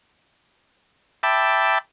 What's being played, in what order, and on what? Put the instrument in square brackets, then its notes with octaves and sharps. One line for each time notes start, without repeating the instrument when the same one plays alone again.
[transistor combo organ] E5 G5 A5 B5 D6